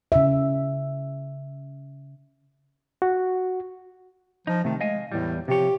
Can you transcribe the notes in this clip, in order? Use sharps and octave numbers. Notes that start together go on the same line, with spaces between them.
C#3 E5
F#4
F3 D#4
C3 D#3 A3
G#3 D#5 F5 G#5
E2 A2 G3
C3 F3 G4 C#5